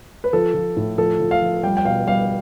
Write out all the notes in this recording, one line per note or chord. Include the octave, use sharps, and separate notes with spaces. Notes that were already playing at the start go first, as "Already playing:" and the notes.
B4
F3 A4
F3
A2
F3 A4
F3
F5
F3
G3 G5
G5
B2 F5
G3 F5